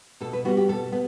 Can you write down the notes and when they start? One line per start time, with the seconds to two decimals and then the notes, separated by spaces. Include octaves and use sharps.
0.21 B2 A4
0.33 B4
0.45 G3 B3 F#4
0.57 G4
0.68 B2 A4
0.92 B3